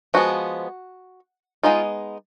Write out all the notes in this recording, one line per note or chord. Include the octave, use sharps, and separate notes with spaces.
F3 G#3 B3 F#4
G#3 B3 D#4 F4